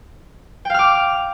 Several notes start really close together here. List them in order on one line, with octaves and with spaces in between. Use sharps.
G5 F5 F6 D6